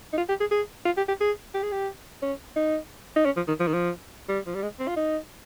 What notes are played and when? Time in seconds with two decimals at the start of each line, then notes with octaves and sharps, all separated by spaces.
0.13 D#4
0.17 F4
0.29 G4
0.40 G#4
0.51 G#4
0.85 F4
0.97 G4
1.08 G4
1.21 G#4
1.54 G4
1.63 G#4
1.72 G4
2.22 C#4
2.56 D#4
3.16 D#4
3.25 C#4
3.36 F3
3.48 D#3
3.60 F3
3.67 D#3
3.73 F3
4.29 G3
4.46 F3
4.55 G3
4.62 G#3
4.80 C4
4.87 F4
4.96 D#4